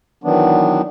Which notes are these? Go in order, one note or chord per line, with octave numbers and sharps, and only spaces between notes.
D#3 E3 F#3 B3 D4